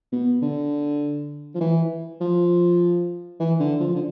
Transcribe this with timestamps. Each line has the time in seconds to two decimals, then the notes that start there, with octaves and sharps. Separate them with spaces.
0.12 B2
0.42 D3
1.55 F3
1.61 E3
2.21 F3
3.40 E3
3.60 D3
3.80 F3
3.95 D3